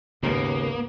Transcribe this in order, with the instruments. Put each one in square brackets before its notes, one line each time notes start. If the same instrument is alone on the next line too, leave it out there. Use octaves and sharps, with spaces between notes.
[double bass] G#1 B3 [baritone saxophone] D#2 [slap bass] C#3 [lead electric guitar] A#3